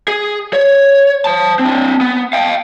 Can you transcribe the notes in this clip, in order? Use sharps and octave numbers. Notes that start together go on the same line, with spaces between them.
G#4
C#5
C5 A5
C4 D4
B3
F5 G5